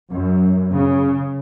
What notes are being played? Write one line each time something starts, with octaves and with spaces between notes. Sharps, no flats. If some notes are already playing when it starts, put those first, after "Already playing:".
F#2
C#3